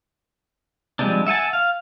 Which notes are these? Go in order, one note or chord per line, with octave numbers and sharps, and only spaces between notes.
F3 G3 G#3 C4 D4
E5 F#5 G#5 A5
F5